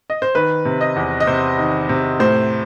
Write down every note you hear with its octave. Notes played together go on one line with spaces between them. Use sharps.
D#5
C5
D#3 B4
C3
D#5
E2
D#5
C3 C5
D#3
C3
A2 C5